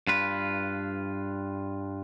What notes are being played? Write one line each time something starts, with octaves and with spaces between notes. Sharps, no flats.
G2 F4 B4